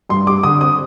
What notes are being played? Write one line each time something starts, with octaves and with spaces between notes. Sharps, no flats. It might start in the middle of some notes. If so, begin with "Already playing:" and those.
G2 C6
G3 D6
D3 D#6
C4 D#6